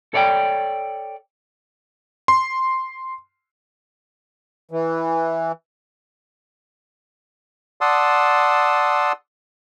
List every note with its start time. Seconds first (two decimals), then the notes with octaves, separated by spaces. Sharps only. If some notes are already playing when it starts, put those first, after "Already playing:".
0.14 A4 C#5 D5 F#5 G5
2.28 C6
4.71 E3
7.81 D5 F#5 A5 C6 D#6 E6